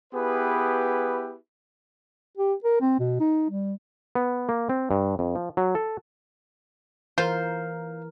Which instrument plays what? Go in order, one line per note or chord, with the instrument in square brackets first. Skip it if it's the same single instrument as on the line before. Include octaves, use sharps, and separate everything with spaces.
[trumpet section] B3 E4 G4 G#4 B4
[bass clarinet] G4
A#4
C4
B2
D#4
G3
[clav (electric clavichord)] B3
A#3
C4
G2
F2
F3
F#3
A4
[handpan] E3 A#4 [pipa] F4 C5